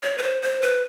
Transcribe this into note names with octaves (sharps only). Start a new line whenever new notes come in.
C#5
B4
C5
C5
B4